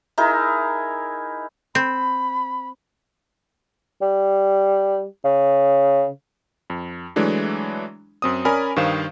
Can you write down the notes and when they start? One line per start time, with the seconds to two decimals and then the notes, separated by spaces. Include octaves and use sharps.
0.18 D#4 E4 G#4 A#4
1.75 C4 B5
4.02 G3
5.24 C#3
6.70 F2
7.16 E3 F#3 G#3 A3 D4 E4
8.22 F#2 C4 D#6
8.45 C#4 A#4 D5 G#5 B5
8.76 G2 D#3 C5 F5 E7